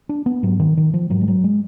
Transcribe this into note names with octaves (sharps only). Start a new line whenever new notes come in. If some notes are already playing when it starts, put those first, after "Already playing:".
D4
B3
G#2 F#3
D#3
D#3
F3
G#2 F#3
G#3
F#3
G#3